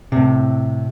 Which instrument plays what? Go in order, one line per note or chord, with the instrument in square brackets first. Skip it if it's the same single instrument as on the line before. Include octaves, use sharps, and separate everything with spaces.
[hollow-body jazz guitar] A2 C3